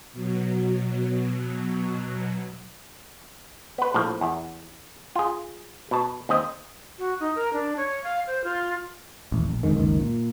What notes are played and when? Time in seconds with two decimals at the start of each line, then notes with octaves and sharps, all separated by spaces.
0.13 B2 F#3
3.78 B3 B4
3.94 A#1 A2 F3
4.21 E2
5.15 F4 G#4
5.91 B2 A5
6.29 D#2 C4 D#5
6.99 F#4
7.20 D#4
7.36 A#4
7.53 D4
7.77 C#5
8.04 F5
8.27 C5
8.44 F4
9.32 D#1 A1
9.49 A#1
9.63 F#1 F2 G#2 D#3
9.76 F#1 C#2 D#3
9.99 A#2